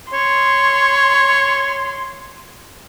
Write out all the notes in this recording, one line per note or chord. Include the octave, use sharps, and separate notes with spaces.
C#5 C6